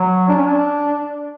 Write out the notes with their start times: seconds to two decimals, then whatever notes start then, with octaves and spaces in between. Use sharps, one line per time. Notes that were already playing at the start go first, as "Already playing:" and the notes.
Already playing: F#3
0.28 D4
0.36 C#4
0.45 D4